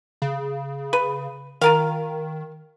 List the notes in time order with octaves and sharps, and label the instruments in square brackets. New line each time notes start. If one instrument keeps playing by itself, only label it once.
[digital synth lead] C#3
[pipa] B4
[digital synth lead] D#3 [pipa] F4 A#4 F5